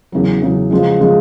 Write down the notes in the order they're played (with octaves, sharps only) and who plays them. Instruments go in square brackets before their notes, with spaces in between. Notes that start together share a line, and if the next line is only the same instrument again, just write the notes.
[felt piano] E2 C#3 F#3
E2 C#3 F#3
C#3 F3 G#3
C#3 F3 G#3